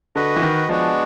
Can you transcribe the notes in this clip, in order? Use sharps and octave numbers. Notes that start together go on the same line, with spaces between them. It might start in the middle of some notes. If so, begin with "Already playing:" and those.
D3 F#4 B4 D#5
E3
D#3
F3 G#3 B3 D4 F#4